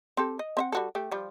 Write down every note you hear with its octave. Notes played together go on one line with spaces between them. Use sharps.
C4 G4 A4
D#5
C4 E5 F#5
G3 F#4 A4
A3 G4
F3 G3 F4